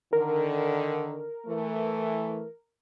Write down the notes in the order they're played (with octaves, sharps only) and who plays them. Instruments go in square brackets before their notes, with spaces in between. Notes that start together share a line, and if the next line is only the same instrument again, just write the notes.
[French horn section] D3 D#3 [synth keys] A#4
[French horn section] E3 A3